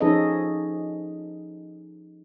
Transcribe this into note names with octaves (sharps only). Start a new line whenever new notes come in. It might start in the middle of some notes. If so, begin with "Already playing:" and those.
F3 C#4 D#4 G#4 A4 D#5